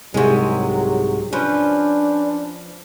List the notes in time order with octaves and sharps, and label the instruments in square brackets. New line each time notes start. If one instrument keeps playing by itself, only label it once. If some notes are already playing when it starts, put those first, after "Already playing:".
[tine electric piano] C2 G#2 F#4 [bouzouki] C3 G#3 [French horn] F#3
[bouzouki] F3 [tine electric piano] C#4 B4 C5 [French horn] D4